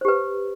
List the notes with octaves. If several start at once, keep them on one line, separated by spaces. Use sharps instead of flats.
G4 B4 C5